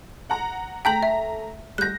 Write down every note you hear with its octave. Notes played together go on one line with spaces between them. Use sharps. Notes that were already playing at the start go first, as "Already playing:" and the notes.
F#5 A#5
A3 G5 A#5 G6 B6 F#7
E5
G3 F#6 G6 A#6